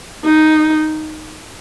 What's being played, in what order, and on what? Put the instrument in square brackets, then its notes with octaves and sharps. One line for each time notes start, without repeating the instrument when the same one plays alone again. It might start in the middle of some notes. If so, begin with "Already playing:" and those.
[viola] D#4